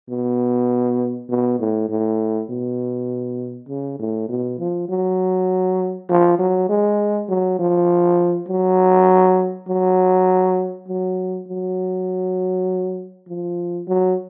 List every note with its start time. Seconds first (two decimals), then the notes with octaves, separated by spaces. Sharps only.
0.09 B2
1.29 B2
1.59 A2
1.89 A2
2.50 B2
3.69 C#3
3.99 A2
4.29 B2
4.59 F3
4.89 F#3
6.09 F3
6.39 F#3
6.69 G#3
7.28 F#3
7.59 F3
8.49 F#3
9.68 F#3
10.88 F#3
11.48 F#3
13.29 F3
13.88 F#3